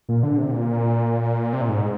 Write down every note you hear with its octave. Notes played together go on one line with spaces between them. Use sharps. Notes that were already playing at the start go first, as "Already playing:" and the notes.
A#2
D3
C3
A#2
C3
A#2
G#2